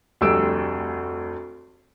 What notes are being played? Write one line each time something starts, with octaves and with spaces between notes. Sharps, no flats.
F1 D2 G3 E6 D7